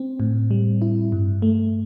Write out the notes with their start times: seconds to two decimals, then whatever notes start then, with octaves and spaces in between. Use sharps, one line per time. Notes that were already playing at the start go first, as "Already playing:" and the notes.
Already playing: C4
0.20 A2
0.51 G3
0.82 E4
1.12 G2
1.42 A3